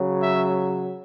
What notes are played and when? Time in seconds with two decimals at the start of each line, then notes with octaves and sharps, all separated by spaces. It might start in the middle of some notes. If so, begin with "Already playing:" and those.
Already playing: C#3 F#3
0.19 E5